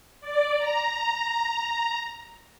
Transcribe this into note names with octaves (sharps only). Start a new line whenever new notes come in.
D5
A#5